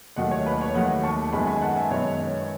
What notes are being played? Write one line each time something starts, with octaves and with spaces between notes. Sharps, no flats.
D#2 D#3 F#3 A3 D#5 F#5
C#5
B4
C#5
D#2 D#3 F#3 A3 D#5 F#5
A5 C#6
F#2 D#3 G#3 B3 G#5 B5
G#5 B5
F#5 A5
E5 G#5
F#2 D#3 G#3 B3 C#5
C#5